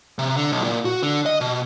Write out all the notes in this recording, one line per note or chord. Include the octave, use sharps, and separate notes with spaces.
C3
D3
B1
A#2
F#4
D3
D#5
B2